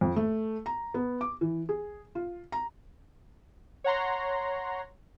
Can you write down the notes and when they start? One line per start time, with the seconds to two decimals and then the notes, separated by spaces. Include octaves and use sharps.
0.01 F2
0.16 A3
0.66 A#5
0.94 B3
1.21 D6
1.41 E3
1.69 G#4
2.15 F4
2.52 A#5
3.84 C#5 F#5 A#5 C6